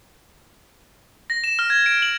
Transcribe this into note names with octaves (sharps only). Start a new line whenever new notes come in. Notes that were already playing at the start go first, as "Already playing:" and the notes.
A#6
E7
F6
G#6
D7
F#7